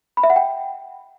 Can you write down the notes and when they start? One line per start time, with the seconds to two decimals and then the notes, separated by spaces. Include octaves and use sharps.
0.17 B5
0.24 E5
0.30 F#5
0.36 G5